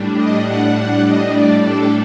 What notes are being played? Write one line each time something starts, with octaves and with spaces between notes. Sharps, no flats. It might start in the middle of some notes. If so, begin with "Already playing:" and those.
Already playing: A2 G3 D4
D#5
F#5
F#5
D#5
D5
A4